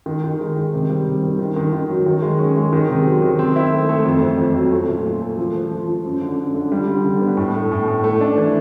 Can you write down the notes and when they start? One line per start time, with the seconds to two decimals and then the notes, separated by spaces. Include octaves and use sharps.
0.06 D#3
0.24 D#3
0.40 G#3
0.57 D#3
0.73 C3
0.89 G3
1.06 C3
1.23 D#3
1.39 D#3
1.56 D#3
1.73 D#3
1.89 F#3
2.06 D#3
2.22 G#3
2.39 C#4
2.56 G#3
2.73 D#3
2.89 C3
3.06 F#3
3.22 D#3
3.39 C4
3.56 E4
3.72 A3
3.89 A3
4.05 F2
4.22 F2
4.38 F2
4.55 F#3
4.72 A3
4.89 A#2
5.05 A#2
5.22 A3
5.38 F3
5.55 F3
5.71 F3
5.88 F3
6.05 F#2
6.21 D3
6.39 F#2
6.54 D3
6.72 G3
6.88 D3
7.05 D3
7.21 B3
7.37 A2
7.54 A3
7.71 A2
7.88 A2
8.04 A3
8.21 D4
8.38 E3